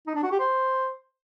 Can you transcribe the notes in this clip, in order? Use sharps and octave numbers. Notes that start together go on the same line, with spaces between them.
D#4
D4
F#4
G4
C5